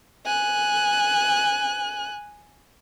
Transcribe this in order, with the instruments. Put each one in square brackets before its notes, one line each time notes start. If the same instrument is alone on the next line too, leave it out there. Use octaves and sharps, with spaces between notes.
[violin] G#5 F#6